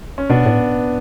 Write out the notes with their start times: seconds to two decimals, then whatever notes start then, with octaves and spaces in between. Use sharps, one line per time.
0.18 C#4
0.30 B2 B3 D4
0.46 A2